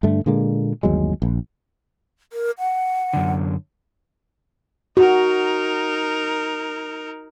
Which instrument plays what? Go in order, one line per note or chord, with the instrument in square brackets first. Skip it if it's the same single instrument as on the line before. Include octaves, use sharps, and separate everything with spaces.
[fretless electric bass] G2 D3 A3
A#2 D3 G#3 A#3
G1 D#2 F#3 G#3
A#1
[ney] A#4
F#5
[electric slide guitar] F#2 D3
[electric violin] D#4 A#4 [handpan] F#4